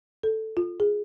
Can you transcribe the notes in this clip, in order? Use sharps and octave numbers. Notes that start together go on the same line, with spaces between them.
A4
F4
G#4